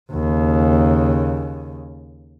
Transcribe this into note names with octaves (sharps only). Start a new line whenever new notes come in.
D#2 C#3